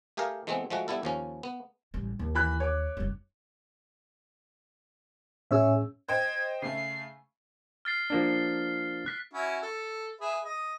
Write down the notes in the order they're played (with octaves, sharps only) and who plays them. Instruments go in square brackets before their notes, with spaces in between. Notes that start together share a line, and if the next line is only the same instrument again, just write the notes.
[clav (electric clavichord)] A3 G4 G#4 A#4 F5
E3 G#3 A3 B3 C4
F3 G#3 A3 F#4
G3 B3 E4 A4
D#2 F3 C#4
B3
[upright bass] A1 G3
D#2
[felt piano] E3 B5 F#6
C#5 D6
[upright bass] F1 G3
[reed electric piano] A2 C#4 E6 [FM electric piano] G#4 C#5 E5
[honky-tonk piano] C5 D#5 G5 [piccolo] G#6
[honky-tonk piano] C#3 A3 [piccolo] C7
[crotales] F6 A6 C7
[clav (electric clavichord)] F3 A#3 D4
[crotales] F#6 B6
[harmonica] C#4 E4 F#4
A4
G#4 B4 E5
D#5